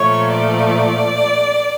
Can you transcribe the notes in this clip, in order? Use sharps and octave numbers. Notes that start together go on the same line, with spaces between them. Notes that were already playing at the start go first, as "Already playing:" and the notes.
Already playing: A#2 F3 A3 C#5
D5